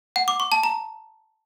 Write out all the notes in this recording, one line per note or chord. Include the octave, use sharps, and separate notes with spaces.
F#5
D6
C#6
A5
A#5